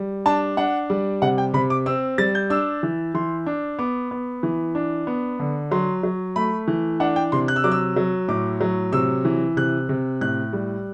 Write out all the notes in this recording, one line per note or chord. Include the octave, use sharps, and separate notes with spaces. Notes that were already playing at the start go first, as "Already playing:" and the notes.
Already playing: G3
D4 A5
D4 F#5
G3
C3 F#5
G5
C3 B5
D6
C4 E6
G3 A6
G6
D4 E6
E3
E3 C6
D4
B3 D6
B3
E3
D4
B3
D3
F#3 C6
F#3
A3 B5
E3
D4 F#5
G5
C3 C6
F#6
E6
F#3 D6
E6
F#3
A2 D6
F#3
C3 E6
E3
C3 F#6
C3
A2 F#6
G3